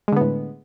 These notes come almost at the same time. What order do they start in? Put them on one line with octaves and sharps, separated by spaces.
G#3 D3 B3 A2